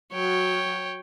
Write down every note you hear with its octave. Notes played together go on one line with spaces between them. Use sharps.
F#3 F#4 C#5 G5